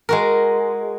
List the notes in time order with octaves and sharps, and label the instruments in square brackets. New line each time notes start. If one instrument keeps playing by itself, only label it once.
[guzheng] G#3 F#4 A#4